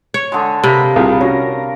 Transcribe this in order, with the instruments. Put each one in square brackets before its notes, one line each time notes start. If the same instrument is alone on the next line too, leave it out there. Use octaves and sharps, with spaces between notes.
[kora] C#5
[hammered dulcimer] D3 G#3
[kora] C3 [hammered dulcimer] A#4 F5 B5
[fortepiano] C2 F4 G#4
[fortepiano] C#4 F#4 [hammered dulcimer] A#4